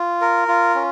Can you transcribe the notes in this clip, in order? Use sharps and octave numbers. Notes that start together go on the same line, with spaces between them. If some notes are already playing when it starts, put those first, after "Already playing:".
Already playing: F4
A#4
F4
C#4